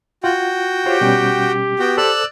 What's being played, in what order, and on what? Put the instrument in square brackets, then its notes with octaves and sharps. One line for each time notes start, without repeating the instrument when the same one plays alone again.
[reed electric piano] F4 F#5 [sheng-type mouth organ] F#4 G5
[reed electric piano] F4 C5 C#5 [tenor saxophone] G4
[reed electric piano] B2 G3 C#4
[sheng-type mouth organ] B3 F#4 G5
[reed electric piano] A4 C5 [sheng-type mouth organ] D5 E6 F#6